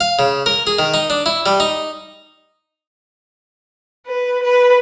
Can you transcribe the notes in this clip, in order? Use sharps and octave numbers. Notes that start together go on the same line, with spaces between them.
F5
C#3
A#4
G#4
D#3
D#4
D4
E4
G3
D#4
B4
B4